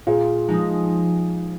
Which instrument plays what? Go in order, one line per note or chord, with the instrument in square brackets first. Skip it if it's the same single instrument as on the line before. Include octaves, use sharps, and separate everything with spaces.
[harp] A#2 [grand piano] F4 G#4
[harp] F3 G#3 D#4